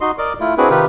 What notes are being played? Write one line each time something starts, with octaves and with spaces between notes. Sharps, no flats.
D#4 F#4 D#5 C6
A#4 D5 D#5 D6
A3 E4 F4
C4 D4 E4 F#4 G#4 B4
C3 D#3 D#4 F4 G4 B4